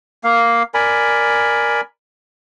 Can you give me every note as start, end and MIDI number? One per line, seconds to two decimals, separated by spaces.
0.24 0.63 58
0.24 0.63 77
0.74 1.81 70
0.74 1.81 74
0.74 1.81 80
0.74 1.81 83